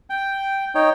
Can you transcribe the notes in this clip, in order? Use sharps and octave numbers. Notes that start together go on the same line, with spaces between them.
G5
D#4 C#5 G5